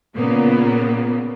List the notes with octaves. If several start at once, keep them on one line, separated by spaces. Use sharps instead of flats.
A#2 C#3 A#3 B3